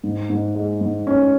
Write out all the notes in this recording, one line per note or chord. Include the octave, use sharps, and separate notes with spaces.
G#2
G#2
G#3
G#2
C#4